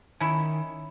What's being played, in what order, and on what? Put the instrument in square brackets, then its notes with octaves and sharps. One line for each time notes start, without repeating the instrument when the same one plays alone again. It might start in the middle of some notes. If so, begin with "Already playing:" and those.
[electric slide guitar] D#3 [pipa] C#4 E4